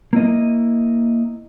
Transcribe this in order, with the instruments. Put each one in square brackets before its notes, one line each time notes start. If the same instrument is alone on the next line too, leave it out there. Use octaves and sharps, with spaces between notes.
[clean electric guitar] A#3 E4 D#5